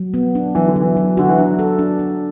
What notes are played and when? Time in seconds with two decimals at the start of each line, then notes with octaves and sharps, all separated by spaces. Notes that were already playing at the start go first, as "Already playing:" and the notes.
Already playing: F#3
0.14 B3
0.35 D4
0.55 E3 F#3
0.68 D3
0.76 F#3
0.81 E3
0.97 F#3
1.17 D3 F#4
1.29 E3
1.38 F#3 D4
1.59 A4
1.79 D4
1.99 D4